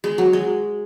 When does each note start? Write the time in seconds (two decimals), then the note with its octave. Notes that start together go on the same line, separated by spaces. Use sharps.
0.04 G#3
0.18 F#3
0.33 G#3